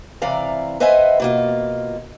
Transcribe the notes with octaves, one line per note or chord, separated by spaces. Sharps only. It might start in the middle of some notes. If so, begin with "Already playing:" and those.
C3 E3 D5 F5 A#5
B4 C5 D#5 E5 F#5 G#5
B2 A#3 F4